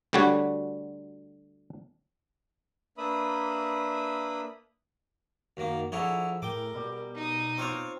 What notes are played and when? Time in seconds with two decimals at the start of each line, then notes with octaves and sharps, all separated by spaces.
0.13 D2 D3 G3 F#4 C#5
2.98 A#3 D4 B4 E5 B5 D#6
5.57 F#2 D#3 A#3
5.92 D3 F3 E4 G#4 C#5 A#5 E6
6.42 A2 A#4 G5 D6
6.75 B2 G3
7.15 D#4 D#6
7.58 C4 F4 C#5 F5 C#6 D6